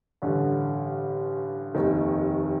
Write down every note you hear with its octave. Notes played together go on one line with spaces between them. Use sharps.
A1 G2 D3
F1 D#2 D#3